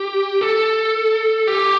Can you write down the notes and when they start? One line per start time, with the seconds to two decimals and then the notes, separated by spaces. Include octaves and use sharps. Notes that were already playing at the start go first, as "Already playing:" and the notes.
Already playing: G4
0.41 A4
1.47 G4